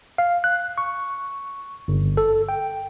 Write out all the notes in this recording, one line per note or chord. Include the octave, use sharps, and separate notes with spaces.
F5
F#6
C#6
G1
A4
G5